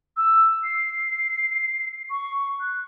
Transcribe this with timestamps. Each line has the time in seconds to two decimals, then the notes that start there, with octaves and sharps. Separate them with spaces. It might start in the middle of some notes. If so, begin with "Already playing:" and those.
0.17 E6
0.64 C7
2.10 C#6
2.60 F#6